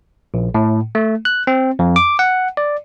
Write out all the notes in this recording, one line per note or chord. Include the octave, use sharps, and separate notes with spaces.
A#1
A2
A3
F#6
C4
F2
D6
F#5
D5